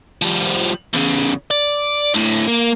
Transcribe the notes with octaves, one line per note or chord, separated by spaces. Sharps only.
F3 G3
E2 C#3
D5
D2 A2
A#3